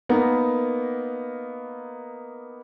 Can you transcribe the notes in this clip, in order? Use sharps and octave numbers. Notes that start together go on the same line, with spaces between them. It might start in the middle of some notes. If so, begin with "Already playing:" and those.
A#3 B3 D#4 A#4